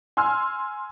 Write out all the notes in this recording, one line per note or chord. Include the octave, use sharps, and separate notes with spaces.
G#5 C6 E6 F6